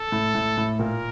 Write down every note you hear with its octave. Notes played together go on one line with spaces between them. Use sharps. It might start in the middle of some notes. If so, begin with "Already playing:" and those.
Already playing: A4
A2
A2
A2
A#2 A#4